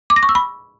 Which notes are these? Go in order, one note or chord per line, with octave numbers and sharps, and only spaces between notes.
D6
A#6
C#6
E6
B5